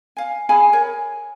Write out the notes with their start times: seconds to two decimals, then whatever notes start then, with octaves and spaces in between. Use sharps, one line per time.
0.17 F5 G#5
0.49 G#4 F5 G#5 B5
0.73 A#4 C#5 G#5